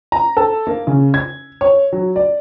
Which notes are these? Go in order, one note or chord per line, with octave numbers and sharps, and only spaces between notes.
A#5
A4
A#3
C#3
G#6
C#5
F#3
D5